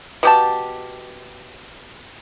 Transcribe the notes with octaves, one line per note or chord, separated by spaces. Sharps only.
B2 G4 A5